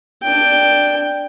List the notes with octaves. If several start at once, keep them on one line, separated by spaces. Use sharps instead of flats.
D4 G5